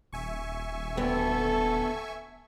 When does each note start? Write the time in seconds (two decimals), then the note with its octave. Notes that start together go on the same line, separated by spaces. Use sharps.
0.13 D#1 E5 G#5 C#6
0.97 D2 B3 A4 G5